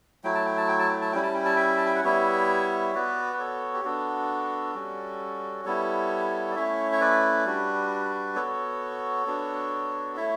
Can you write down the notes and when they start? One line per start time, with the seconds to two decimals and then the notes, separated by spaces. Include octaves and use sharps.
0.24 F#3 A3 E4 G5
0.35 A5
0.46 G5
0.57 A5
0.68 G5
0.79 A5
0.89 G5
1.01 A5
1.12 G3 C#4 E4 G5
1.23 A5
1.34 G5
1.45 A5
1.56 E5 G5
1.77 A5
1.86 G5
1.95 F#5
2.04 G3 B3 E4 C#5 E5
2.95 B3 F#4 B4 D5
3.33 B4
3.40 A4 C#5
3.74 G4
3.85 B3 D4 F#4 A4
4.75 G3 C#4 F#4
5.65 G3 B3 E4 A4 C#5
6.51 D5
6.56 A3 C#4 E4 C#5 E5
6.92 C#5
7.01 B4 D5
7.46 G3 D4 F#4
8.36 B3 F#4 A4 C#5
9.27 B3 D4 F#4
10.16 A3 E4 C#5 E5